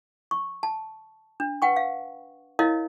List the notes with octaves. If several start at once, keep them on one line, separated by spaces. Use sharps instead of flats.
C#6
A5
D4
B4 F#5 G5 C#6
F5
E4 A#4 C#5 D#5 F5